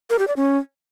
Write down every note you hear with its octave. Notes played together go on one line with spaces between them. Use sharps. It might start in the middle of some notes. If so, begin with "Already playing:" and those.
A#4
G4
D5
C#4